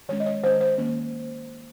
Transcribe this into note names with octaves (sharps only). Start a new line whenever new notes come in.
D#3 G#3 C#4 C#5
D#5
C#5
D#3 G#3 C#4 C5
C5
D#3 A#3 C#4